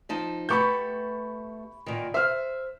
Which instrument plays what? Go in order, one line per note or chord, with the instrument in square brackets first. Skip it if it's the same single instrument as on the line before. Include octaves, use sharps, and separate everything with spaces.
[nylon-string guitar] F3 D#4 A5
[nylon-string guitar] A3 B3 G4 [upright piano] B5 C#6 G6
[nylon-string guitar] A#2 D#3
[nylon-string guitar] C5 [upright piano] E5 F6